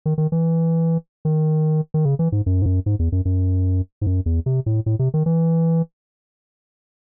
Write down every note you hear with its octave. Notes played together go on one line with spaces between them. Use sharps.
D#3
D#3
E3
D#3
D#3
C#3
E3
G#2
F#2
G#2
F#2
G#2
E2
F#2
F#2
G#2
F#2
E2
C3
A2
A2
C3
D#3
E3